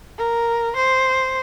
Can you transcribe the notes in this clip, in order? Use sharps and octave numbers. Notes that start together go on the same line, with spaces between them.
A#4
C5